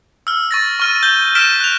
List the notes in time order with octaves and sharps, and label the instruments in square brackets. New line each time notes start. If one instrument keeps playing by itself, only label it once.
[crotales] E6 F6
C#6 A6 A#6
C#6 F6 D#7
G6 G7
F6 G6 B6 D7 E7 G7
F#6 F7